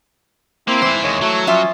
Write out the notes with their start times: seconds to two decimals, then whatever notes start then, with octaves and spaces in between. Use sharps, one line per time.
0.68 A#3 C4 E4
0.82 E3 G#3 C5
1.03 D#2 G#3 C#5
1.22 F#3 A3
1.47 F3 C#4 F4 E5